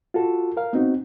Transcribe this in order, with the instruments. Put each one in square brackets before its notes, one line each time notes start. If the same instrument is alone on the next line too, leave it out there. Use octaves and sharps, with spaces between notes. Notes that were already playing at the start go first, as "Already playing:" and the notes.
[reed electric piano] F4 F#4 A4
A#4 F5
B3 C4 D#4 F#4